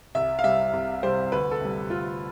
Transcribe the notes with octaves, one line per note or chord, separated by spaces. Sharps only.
C2 E5
F5
C3 G3 E5
C2
C3 G3 C5
D2 B4
A4
C3 G3
D2 F4